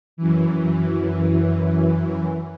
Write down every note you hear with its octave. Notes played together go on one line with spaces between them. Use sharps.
F#2 E3